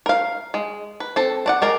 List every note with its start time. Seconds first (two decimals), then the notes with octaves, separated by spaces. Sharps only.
0.06 A#4 F5
0.54 G#3
1.00 B4
1.16 C4 A4
1.46 D4 D5 F#5
1.62 G#3 A#4 D5